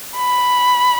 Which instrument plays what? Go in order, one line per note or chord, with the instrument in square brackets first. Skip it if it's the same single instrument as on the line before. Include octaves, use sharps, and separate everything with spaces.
[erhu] B5